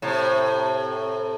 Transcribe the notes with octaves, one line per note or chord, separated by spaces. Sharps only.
A2 C3